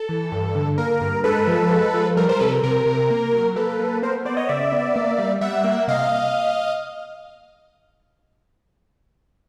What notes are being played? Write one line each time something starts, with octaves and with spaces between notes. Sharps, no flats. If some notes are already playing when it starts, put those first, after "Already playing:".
Already playing: A4
E3
G2
D3
A#3 A#4
G2
G#3 A4 B4
F3
G#3
F3
G3 A#4
A#4 C5
C3 A4 B4
A#4
C3 A#4
C3
A#3
F#3
A#3 A4 B4
A#3
B3 A#4 C5
B3 C5 D5
C#5 D#5
C#3 D5 E5
B3
A#3
G3
G3 E5 F#5
A#3
C3 D#5 F5